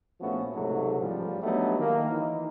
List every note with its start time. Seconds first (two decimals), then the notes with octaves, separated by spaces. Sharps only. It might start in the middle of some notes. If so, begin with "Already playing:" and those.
0.20 A#1 F3 A3 B3 C#4 F#4
0.54 C#2 G#2 C3 F#3 A3
1.00 A1 F3 G3
1.41 F#3 G3 A3 B3 D4 D#4
1.78 D#3 A#3
2.10 E3 D#4 E4